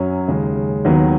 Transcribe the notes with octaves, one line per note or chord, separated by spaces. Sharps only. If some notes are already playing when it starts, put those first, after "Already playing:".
Already playing: F#2 F#3 C#4
D#2 C#3 G#3
D#2 D#3 F#3 B3